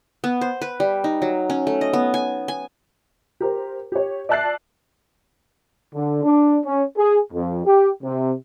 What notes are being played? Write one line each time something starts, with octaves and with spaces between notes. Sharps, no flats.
B3
C5
B4
G3
D#4
F#3
C#4
A3
D#5
B3
G#5
G#5
G4 A#4 C5
G4 C#5
D5 E5 A5 F#6 A6 C7
D3
D4
C#4
G#4
F2
G4
C3